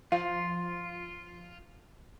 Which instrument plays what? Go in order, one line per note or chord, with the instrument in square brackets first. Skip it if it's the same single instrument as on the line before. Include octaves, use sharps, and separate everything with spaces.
[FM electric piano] F3 [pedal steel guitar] F4 [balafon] F5